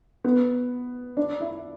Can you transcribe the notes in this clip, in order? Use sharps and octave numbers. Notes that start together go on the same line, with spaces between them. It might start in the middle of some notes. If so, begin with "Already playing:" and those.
B3
D4
E4